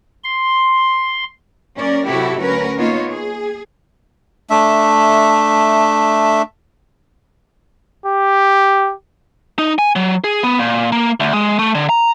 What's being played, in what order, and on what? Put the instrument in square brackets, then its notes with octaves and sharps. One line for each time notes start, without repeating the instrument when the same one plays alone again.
[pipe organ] C6
[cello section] F#3 A#3 C#4 A#4 D5
C3 F#3 E4 F#4 G4 A4
D2 C#4 F#4 A#4 B4
A#3 B3 D#4 F4 C#5
G#4
[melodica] A3 D4 E5
[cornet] G4
[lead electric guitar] D#4
G#5
F#3
G#4
B3
A#2
A#3
D2
G#3
A3
D3
A#5